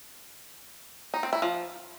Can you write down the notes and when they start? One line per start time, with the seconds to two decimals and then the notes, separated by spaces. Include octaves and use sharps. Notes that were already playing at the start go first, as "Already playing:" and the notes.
1.14 D#4
1.23 C4
1.33 E4
1.42 F3